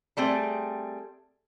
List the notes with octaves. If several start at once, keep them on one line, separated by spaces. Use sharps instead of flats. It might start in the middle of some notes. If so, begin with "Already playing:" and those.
G3 A3 C4 G#4